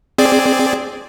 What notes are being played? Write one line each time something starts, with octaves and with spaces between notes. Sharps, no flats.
C4 G#4 D5